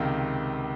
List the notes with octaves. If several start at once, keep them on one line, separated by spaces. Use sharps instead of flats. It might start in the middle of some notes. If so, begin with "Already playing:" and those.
Already playing: C#2 C3 D#3 F5